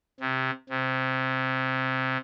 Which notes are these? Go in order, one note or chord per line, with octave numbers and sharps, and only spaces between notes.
C3
C3